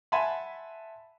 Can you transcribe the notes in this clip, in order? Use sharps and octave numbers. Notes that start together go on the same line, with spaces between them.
E5 F#5 G#5 A5 B5 C6